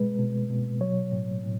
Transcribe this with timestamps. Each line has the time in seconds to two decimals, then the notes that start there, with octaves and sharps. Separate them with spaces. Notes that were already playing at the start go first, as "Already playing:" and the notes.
Already playing: B2 G#3 B4
0.19 B2
0.50 B2
0.81 F#3 C#5
1.12 A2
1.43 A2